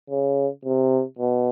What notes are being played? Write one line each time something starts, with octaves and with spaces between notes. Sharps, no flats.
C#3
C3
B2